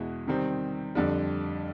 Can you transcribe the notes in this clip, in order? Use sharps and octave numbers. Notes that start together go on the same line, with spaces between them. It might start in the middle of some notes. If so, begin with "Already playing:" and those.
Already playing: E2 B2 G#3 B3 E4
C3 D#3 G3 C4
F2 D3 G3